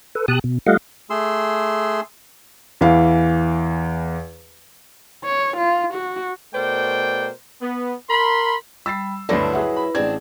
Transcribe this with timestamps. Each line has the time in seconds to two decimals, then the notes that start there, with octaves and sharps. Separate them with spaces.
0.15 A4 B4
0.28 B2 G4 A5 D#6 F#6
0.44 B2
0.66 G3 A3 F4 D#5 F5 F#5
1.10 A3 G#4 C6 E6
2.81 E2 E3 F5
5.25 C#5
5.57 F4
5.94 F#4
6.54 B2 A3 A#4 C5 D5 G5
7.61 B3
8.09 A#4 B5 C6
8.86 G3 B5 E6 A6 C7
9.29 D2 G2 F#3 E4 A4 B4 D5 A#6
9.53 G#4 E5 F#5
9.77 B5
9.95 A1 C4 D4 G#4 G#6